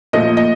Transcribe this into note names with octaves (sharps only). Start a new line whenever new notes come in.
A#2 F3 A3 D#5
D#5